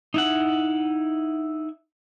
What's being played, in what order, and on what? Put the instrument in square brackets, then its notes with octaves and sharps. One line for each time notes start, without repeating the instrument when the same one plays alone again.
[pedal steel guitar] D#4 E4 F#5